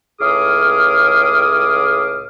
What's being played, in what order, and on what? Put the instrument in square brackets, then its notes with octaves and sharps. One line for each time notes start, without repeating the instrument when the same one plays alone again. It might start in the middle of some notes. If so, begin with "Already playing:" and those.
[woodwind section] C#2 A2 G#4 D6 D#6 F6